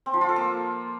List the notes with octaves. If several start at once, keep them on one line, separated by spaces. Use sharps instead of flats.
C4
F3
F4
A4
A#3